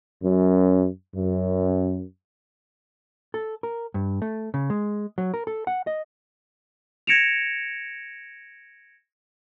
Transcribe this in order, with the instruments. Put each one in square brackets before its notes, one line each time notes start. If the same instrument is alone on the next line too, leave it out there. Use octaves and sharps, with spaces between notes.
[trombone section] F#2
F#2
[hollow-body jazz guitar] A4
A#4
G2
A3
C#3
G#3
F#3
A#4
A4
F#5
D#5
[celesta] G#6 A#6 C#7 D7 E7 F7